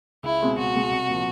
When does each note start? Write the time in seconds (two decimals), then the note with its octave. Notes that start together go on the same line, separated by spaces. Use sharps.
0.23 C#2 E4
0.41 B2 G#3 C4
0.57 C#2 F#4
0.74 B2 G#3 C4
0.91 C2
1.07 A#2 F3